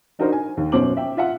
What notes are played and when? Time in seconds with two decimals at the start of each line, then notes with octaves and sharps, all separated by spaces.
0.19 D4 D#4 F#4 A#4 C5
0.32 G#5
0.57 D#2
0.72 F#2 B2 C#4 C5 D6 F#7
0.97 E5 G5
1.17 F4 E5 F#5